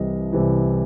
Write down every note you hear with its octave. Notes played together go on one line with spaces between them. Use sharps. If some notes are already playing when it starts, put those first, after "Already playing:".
Already playing: C2 C3 E3 D#5
C2 C3 E3